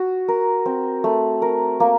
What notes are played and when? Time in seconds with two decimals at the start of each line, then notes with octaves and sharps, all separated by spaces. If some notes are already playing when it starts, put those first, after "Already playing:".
Already playing: F#4
0.28 A#4
0.66 C4
1.04 A3
1.42 A#4
1.80 A#3